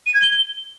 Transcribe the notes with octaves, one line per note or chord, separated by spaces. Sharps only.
D#7
G#6
G7